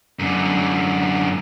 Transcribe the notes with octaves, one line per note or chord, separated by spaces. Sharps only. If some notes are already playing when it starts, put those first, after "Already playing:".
F#2 D3